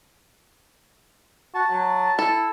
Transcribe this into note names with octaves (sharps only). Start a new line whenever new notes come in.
F#4 A5
F#3
E4 A4